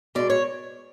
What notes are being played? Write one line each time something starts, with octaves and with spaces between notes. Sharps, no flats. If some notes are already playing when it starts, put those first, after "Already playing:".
B2 G#3 D5
C#5